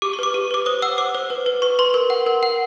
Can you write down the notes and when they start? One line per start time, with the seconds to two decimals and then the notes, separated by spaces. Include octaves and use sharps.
0.02 G4 D6
0.13 C#6
0.19 B4 D6
0.34 G4
0.51 B4 D6
0.66 C5 D#6
0.82 F#5 E6
0.98 C5 D6
1.15 C5
1.30 B4
1.46 B4
1.62 B4 C#6
1.79 B4 C6
1.94 A#4
2.10 F#5
2.26 A#4
2.43 F#5